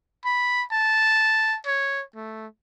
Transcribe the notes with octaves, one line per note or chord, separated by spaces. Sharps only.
B5
A5
C#5
A3